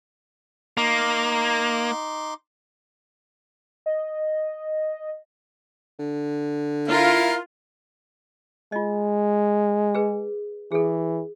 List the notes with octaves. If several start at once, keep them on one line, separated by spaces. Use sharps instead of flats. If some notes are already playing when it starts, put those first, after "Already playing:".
A#3 D#4 C6 D6
D#5
D3
E4 F4 A#4 F5
G#3 F4 D#5
G#4 B4
E3 G#4 A4